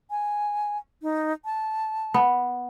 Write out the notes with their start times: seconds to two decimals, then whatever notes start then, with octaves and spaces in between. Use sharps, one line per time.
0.10 G#5
1.02 D#4
1.45 A5
2.14 B3